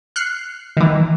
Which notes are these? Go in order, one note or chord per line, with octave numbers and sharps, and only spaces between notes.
F6 F#6 C7 C#7
D#3 E3